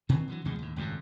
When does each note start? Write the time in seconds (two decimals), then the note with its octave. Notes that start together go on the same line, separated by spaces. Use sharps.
0.09 A#2 D#3 E3 C4
0.28 D3 E3 F#3
0.45 D2 B2 F3 G#3
0.59 D#2 A2
0.76 G#1 C#2 F#2 A2